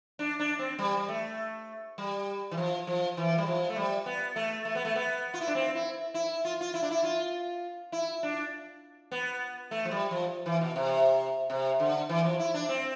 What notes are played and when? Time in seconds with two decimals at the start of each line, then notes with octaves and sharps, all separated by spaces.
0.19 D4
0.39 D4
0.59 C4
0.79 G3
0.97 G3
1.09 A3
1.98 G3
2.51 E3
2.57 F3
2.87 F3
3.17 E3
3.38 G3
3.46 F3
3.70 A3
3.76 G3
4.06 B3
4.36 A3
4.65 A3
4.75 B3
4.85 A3
4.95 B3
5.34 F4
5.41 E4
5.47 D4
5.55 C4
5.75 E4
6.14 E4
6.45 F4
6.61 F4
6.74 E4
6.83 D4
6.91 E4
7.04 F4
7.92 E4
8.23 D4
9.12 B3
9.71 A3
9.85 F3
9.91 G3
10.11 F3
10.46 E3
10.61 B2
10.76 C3
11.50 C3
11.80 D3
12.09 E3
12.25 F3
12.39 E4
12.54 D4
12.69 C4